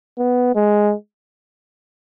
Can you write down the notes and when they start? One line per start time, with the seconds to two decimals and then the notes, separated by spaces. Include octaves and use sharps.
0.19 B3
0.55 G#3